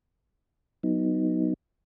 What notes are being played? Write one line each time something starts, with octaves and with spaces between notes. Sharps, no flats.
F#3 B3 D#4